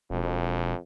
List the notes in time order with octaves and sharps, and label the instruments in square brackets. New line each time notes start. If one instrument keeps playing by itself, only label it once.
[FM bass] E1 [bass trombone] F2